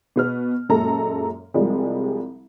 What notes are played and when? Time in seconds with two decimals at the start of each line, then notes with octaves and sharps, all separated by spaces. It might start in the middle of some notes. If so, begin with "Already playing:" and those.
0.16 B2 B3 F6
0.69 F#2 A#2 G#3 A4 A#5
1.54 C2 F3 G3 G#3